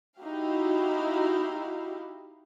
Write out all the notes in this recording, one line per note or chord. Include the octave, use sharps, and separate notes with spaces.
D#4 E4 F#4 G4 F5